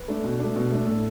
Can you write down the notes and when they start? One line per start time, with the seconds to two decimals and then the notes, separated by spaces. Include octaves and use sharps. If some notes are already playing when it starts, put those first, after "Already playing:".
Already playing: B4
0.08 A3 D4
0.24 B2
0.39 A3 D4
0.56 B2
0.72 A3 D4
0.87 A2 A4